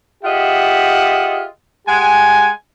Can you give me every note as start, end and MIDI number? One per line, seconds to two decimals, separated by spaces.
0.24 1.45 65
0.24 1.45 67
0.24 1.45 68
0.24 1.45 75
0.24 1.45 76
0.24 1.45 78
1.87 2.48 56
1.87 2.48 67
1.87 2.48 78
1.87 2.48 80